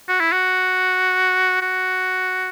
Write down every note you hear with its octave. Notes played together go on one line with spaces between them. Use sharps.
F#4
E4
F#4
F#4